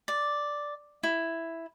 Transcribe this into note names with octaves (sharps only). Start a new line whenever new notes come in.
D5
E4